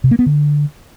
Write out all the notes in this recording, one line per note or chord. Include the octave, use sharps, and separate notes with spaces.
C3
A#3
B3
D3